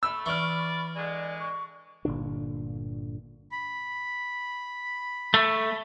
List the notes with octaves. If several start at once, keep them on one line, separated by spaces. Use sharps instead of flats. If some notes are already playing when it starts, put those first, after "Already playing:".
A3 B5 E6
E3 D5 C#6 F6
D3 G#3 D5
C#6
G1 A#2 D3 D4
B5
A3